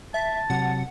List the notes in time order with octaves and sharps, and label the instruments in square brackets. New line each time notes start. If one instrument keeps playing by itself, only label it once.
[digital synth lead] E5 [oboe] A5
[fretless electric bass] C3 F#3 [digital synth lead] F#5